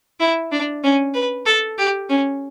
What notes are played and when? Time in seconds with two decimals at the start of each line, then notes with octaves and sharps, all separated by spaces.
0.20 E4
0.52 D4
0.84 C#4
1.15 B4
1.46 A4
1.78 G4
2.10 C#4